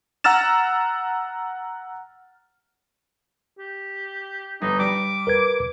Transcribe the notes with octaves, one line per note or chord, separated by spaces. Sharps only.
F#5 A#5 E6 F6 A6 E7
G4
G1 D#4
G3 D6
A#4 B4 G#6